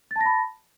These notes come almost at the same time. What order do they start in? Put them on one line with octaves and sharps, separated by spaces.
A6 A5 A#6 B5